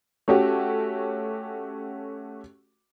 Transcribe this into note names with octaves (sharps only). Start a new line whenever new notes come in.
A3 C#4 F#4 G4